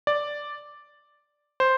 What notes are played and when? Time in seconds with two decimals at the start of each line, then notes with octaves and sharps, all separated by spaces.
0.07 D5
1.60 C5